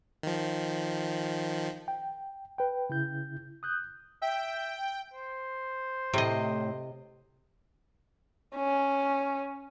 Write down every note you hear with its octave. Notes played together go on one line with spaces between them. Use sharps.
D#3 F3
G5
B4 G5
C#3 E4 G6
D#6 F#6 G6
E5 G5
C5
A2 C3 D#5
C#4